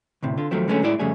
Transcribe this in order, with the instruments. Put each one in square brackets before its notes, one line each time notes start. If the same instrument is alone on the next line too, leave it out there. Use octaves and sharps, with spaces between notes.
[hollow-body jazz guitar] D2 A2 C3
D3 F4
D#2 F3 F#3 A3 C4
D3 F#3 G#3 A3 C4 C#4
A2 G#3 E4 D5
F2 C#3 G3 A3 G#4